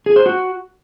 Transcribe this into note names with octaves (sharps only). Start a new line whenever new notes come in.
G#4
C5
F#4